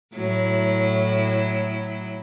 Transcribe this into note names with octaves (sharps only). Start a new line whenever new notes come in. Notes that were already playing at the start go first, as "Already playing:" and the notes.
A2 F#3 E4